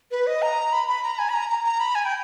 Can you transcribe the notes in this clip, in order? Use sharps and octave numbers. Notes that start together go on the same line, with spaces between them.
B4
D#5
A#5
B5
B5
A#5
G#5
B5
A#5
A#5
A#5
B5
G#5
G5